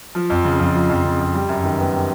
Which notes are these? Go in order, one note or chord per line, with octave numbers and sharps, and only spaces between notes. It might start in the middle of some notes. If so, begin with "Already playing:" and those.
F3
F2
C#3
F2
F3
F2
C#3
F2
G3
F#2
D#3
B3
G3